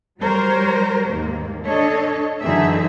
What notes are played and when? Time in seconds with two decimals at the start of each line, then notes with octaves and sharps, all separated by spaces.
0.21 F#3 G3 A#4 C5 C#5
1.08 D#2 G#2 A#3
1.65 D4 A4 C#5 D#5
2.42 F#2 D3 E3 D#4 G#4 E5